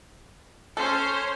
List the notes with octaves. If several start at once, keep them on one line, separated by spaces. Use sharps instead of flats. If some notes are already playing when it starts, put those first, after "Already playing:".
C#4 A4 C5 C#5